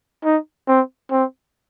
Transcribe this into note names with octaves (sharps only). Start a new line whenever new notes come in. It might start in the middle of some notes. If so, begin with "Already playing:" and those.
D#4
C4
C4